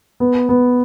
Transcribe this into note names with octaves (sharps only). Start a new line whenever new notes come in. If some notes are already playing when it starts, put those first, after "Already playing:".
B3
B3